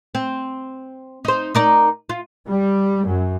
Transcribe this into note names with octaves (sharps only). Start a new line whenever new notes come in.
C4
D#4 C5
D#4 A#4 D5
F4
G3
F#2